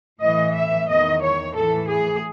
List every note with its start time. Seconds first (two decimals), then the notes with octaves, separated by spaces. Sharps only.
0.21 A2 E3 D#5
0.54 E5
0.88 E2 D#3 D#5
1.21 C#5
1.55 A2 E3 A4
1.88 G#4